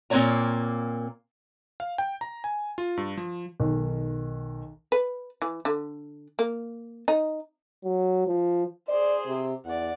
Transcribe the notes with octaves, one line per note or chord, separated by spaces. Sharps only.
A#2 A#3 C4 G#4 C#5 A#5
F5
G5
A#5
G#5
F4
G2
F3
B1 D#3
B4
E3
D3
A#3
D#4
F#3
F3
G#4 C5 D5
C3
E2 D5 F#5